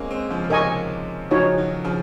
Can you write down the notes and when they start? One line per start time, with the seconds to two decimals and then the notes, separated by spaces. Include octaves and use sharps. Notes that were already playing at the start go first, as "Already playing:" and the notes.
Already playing: G#3 A#3 C4 C#4
0.10 G#3 C4
0.30 C#3 F3
0.44 C#3
0.50 C3 D#3 A#4 D#5 G#5 C#6
1.31 C#3 F3 D#4 F#4 C#5
1.58 D#3 F#3
1.84 C#3 F3